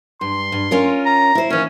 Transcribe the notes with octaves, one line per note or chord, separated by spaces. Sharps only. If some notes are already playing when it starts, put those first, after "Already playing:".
G2 C6
G2
C#4 F4 A#4
A#5
E4 C5
D#2 E3 C#4